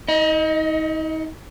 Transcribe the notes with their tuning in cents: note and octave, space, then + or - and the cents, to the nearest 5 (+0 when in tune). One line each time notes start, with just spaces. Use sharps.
D#4 +40 D#5 +0